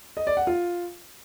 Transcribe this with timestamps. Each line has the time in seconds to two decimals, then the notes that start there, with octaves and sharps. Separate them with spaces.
0.17 D#5
0.27 D5
0.37 F#5
0.47 F4